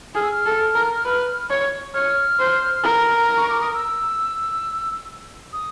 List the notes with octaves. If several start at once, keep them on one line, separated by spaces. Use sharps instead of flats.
G#4 F6
E6
F6
A4
A#4
B4
C#5
C#5 F6
C5
A#4
C#6
D6
D#6
E6
D#6